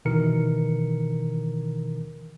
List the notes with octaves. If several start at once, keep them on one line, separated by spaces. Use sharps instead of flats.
B2 D#3 E3 A#4 C#7